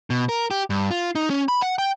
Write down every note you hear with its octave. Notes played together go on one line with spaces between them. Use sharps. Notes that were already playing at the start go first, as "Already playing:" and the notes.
B2
A#4
G4
G2
F4
D#4
C#4
B5
F#5
G5